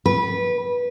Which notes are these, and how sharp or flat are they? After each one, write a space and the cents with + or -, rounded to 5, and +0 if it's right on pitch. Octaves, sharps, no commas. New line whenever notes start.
B4 -15